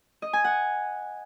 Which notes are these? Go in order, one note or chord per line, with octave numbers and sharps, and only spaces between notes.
D#5
G#5
F#5